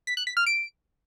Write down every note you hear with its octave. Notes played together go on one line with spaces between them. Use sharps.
B6
F#6
B6
F6
D7